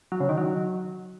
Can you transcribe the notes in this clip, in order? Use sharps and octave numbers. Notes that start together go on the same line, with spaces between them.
F#3
C#3
D#3
F#3